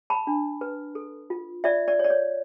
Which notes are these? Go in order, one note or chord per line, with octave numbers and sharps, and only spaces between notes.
A5 B5
D4
B4
A4
F4
F4 D5 E5
D5
C#5
D5
C#5